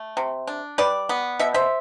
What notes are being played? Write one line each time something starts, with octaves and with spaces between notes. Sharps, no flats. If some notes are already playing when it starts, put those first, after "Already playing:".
Already playing: A3
C3
D4
G3 B4 D5
B3
B2 E5
C5 E5